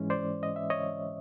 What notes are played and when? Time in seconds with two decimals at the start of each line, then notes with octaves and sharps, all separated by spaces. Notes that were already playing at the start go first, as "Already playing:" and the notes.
Already playing: G#2 E3 G#3 C#4
0.10 C5 D5
0.43 D#5
0.56 E5
0.70 C#5 D#5